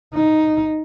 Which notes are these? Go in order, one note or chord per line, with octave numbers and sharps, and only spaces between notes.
D#4